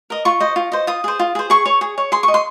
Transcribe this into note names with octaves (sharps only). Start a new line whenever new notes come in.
A#4 D#5
F4 C#6
C5 D#5
F4
C5 D#5
F4 D#6
G#4 C5
F4
G#4 C5
G#4 C#6
C#5
G#4
C#5
G#4 C6
D#5 C#6
C6